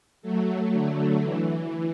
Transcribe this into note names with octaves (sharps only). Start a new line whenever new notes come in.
F#3 A3
D3
E3